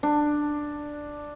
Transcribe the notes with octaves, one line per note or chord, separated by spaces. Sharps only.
D4